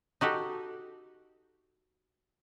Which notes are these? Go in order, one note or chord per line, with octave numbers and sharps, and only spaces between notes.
D#4 F#4 G4 A4